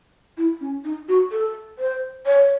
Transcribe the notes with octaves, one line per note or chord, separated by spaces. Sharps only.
E4
C#4
D#4
F#4
A4
C5
C#5